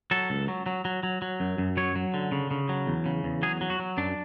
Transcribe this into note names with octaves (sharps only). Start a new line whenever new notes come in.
F#3 A4
C#2
F#3
F#3
F#3
F#3
F#3
F#2
F#2
F#3 C#5
F#3
D3
C#3
C#3
F#3
E2
C#3
E2
F#3 G#4
F#3
F#4
F#3
F#2 D4